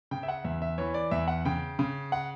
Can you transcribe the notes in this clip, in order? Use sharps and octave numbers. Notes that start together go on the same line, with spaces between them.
C#3 G5
E5
F#5
E2 E5
E5
E3 C#5
D5
E2 E5
F#5
C#3 G5
C#3
F#5